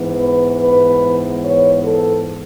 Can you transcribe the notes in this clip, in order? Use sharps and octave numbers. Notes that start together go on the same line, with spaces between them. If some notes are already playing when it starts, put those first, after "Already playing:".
Already playing: G#2 E3 B3
B4
B4
C#5
A4